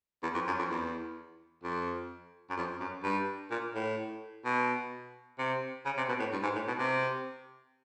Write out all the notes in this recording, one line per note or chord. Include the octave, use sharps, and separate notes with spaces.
E2
F2
F#2
F2
E2
F2
F#2
F2
F#2
G2
A#2
A2
B2
C3
C#3
C3
B2
A2
G2
G#2
A2
B2
C3